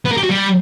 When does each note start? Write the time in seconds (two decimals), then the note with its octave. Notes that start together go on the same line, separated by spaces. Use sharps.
0.05 B3
0.11 A#4
0.17 G4
0.23 F#4
0.30 G3